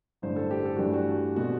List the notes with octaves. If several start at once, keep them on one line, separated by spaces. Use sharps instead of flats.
A1 G2 D3 C5
A4
G4
A4
F#4
G2 E3 A3 D4 G4
F#4
B2 A3 C4 F#4